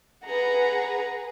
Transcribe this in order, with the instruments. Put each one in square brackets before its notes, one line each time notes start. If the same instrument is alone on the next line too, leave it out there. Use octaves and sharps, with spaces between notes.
[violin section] G#4 B4 [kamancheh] F#5 A#5